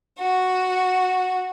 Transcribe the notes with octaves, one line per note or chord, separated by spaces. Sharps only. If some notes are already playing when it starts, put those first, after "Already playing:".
F#4